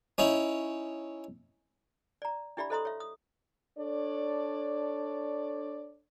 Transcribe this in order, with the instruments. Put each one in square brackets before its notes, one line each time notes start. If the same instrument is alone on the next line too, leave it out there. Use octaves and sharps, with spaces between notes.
[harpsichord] C#4 D#4 E4
[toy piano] D5 A#5
D4 E4 G4 D5 E5 B5
A4 C5 D#5 A#5 C6 D#6
C#5 E5
D#6
[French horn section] D4 A4 C#5 D5